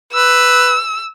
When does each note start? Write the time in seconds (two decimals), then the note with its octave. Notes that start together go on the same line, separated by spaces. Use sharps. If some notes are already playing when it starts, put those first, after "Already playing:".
0.13 B4 E6